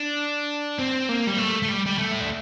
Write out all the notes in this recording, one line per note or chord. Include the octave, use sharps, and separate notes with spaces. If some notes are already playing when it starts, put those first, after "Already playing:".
Already playing: D4
C4
A#3
G3
A3
A3
G3
G3
A3
E4
D4